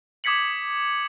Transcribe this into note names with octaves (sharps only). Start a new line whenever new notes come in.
D6 D#6 G#6 B6 C#7 F#7